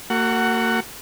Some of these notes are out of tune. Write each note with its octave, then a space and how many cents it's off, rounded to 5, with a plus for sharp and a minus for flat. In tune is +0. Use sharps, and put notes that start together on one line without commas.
A#3 -35 F#4 +15 F#5 +10